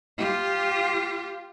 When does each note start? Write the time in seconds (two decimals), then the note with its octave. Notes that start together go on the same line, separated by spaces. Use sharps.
0.18 F4 G4